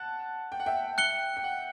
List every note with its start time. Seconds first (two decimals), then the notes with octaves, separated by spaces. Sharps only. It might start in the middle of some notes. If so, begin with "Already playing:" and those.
Already playing: F#5 A5 F#6
0.52 G5
0.60 F#5
0.66 E5 G5
0.98 F#6 C#7 G7
1.37 G5
1.44 F#5